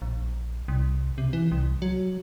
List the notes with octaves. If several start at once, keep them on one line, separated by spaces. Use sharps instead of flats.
A#1
C2
C3
E3
C2
F#3